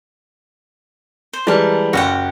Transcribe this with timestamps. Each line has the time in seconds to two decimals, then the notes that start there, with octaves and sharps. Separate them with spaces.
1.33 C5
1.47 E3 G3 G#3 A#4 A5
1.93 F#1 F#4 G4 F#5